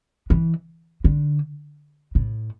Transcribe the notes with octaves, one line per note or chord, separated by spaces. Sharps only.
E3
D3
A2